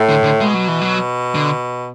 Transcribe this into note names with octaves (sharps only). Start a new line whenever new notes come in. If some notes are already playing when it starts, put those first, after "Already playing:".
Already playing: A2
D3
D3
B2 G#3
F#3
E3
F#3
D3